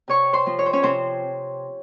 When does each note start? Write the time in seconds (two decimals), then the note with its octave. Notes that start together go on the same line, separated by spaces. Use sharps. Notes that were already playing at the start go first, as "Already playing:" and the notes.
0.08 C3 C#5 C#6
0.33 C5 C6
0.46 F3 C4
0.59 C#5
0.66 C5
0.73 C#4 C#5
0.82 C3 C4 C5